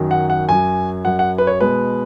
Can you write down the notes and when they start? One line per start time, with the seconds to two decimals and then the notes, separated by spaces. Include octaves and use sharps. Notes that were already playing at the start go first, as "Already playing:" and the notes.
Already playing: F#2 D#3 F#3
0.11 F#5
0.30 F#5
0.49 F#2 F#3 G#5
1.05 F#2 F#3 F#5
1.19 F#5
1.38 B4
1.47 C#5
1.61 B2 G#3 B4